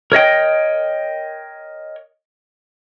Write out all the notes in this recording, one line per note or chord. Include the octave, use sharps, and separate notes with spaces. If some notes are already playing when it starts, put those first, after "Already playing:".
A#4 C#5 D#5 G5